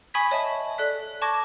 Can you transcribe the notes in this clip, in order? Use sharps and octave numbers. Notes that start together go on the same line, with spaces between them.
G#5 B5 C#6 D#6 G#6 B6
C#5 D#5 E5 A5
A4 D5 F#6 B6
A5 C#6 D6 G#6 A#6